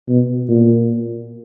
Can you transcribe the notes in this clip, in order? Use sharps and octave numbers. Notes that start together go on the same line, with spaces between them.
B2
A#2